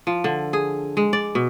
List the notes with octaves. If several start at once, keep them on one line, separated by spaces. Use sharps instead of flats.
F3
D3
G#4
G#3
D5
B2